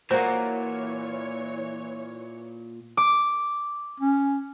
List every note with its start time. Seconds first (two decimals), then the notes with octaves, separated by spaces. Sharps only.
0.11 A#2 E3 A#3 F#4 C5 C#5
2.97 D6
4.00 C#4